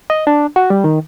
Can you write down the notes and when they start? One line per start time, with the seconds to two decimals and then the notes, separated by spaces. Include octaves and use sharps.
0.10 D#5
0.27 D4
0.56 F#4
0.70 G3
0.84 D#3